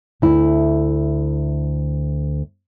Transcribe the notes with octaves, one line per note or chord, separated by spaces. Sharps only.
D2 E4